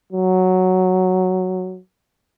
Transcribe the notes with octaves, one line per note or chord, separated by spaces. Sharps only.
F#3